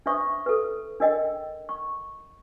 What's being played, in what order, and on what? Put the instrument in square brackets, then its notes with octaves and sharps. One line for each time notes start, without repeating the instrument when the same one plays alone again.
[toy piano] D4 B4 C5 E5 C#6 D#6
A4 B4
D4 A#4 D#5 G5
C#6